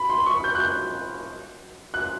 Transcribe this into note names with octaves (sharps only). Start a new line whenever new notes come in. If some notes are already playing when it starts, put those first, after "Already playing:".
Already playing: B5
C6
C#6
G6
F#6
G6
F#6